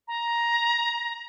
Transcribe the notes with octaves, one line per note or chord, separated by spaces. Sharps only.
A#5